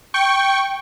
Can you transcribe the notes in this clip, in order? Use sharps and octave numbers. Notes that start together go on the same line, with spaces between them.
G5 C#6